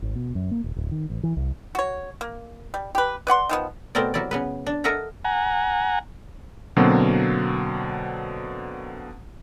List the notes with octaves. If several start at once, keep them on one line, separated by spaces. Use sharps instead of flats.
G#1
B2
F#2
A#3
D#1
D1
D#3
A1
E3
C2
F#4 C#5
A#3
G3
G4 B4
B4 D5 F#5 C6
D#3 F3 B3
B2 A3 B3 C4 A#4 D5
C3 F#3 E4 A#4 D5
C#3 B3 B4
D4
A4 A#4 D#5 E5 F#5 A#5
F#5 G#5 A#5
B2 D3 F#3 A#3 C4